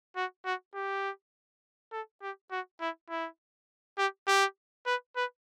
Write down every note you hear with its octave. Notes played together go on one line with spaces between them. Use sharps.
F#4
F#4
G4
A4
G4
F#4
E4
E4
G4
G4
B4
B4